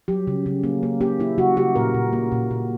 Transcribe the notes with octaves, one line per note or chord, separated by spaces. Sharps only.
F#3 G4
C#3
C#3
A#3
A#3
A#3 G4
A#3 E4
C#3 F#4
C#3 G4
A#2 A#4
A#2
A#3
A#2
A#2